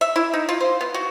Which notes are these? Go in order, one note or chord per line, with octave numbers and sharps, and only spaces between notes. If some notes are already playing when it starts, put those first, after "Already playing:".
E5
E4
D#4
F4
C5
B3
F#4